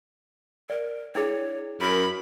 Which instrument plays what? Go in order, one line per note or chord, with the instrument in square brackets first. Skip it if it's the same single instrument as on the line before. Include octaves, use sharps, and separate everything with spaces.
[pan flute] A#4 [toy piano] D5
[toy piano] D4 E4 G#4 [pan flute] C#5
[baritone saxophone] F#2 [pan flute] A#4 [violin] B5